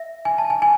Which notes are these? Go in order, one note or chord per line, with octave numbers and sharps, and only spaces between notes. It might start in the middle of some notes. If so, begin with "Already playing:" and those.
Already playing: E5
G#5
A5
G#5
G#5